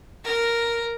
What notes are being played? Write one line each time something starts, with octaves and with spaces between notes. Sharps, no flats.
A#4